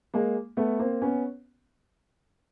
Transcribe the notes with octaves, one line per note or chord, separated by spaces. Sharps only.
G#3 A#3
A3 B3
A#3 C4
B3 C#4